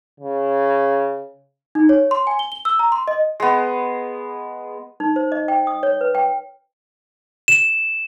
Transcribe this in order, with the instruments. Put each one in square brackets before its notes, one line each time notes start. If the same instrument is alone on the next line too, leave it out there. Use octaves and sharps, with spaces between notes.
[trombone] C#3
[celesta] D#4
C#5
C6
G#5
G7
G7
E6
A#5
C6
D#5
[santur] G#3 B3
[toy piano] D#4
C5
D#5
G5
D#6
C#5
B4
G5
[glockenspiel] E7